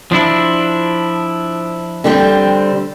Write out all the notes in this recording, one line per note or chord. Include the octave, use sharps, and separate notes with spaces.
F3 D4 E4
D3 G3 C4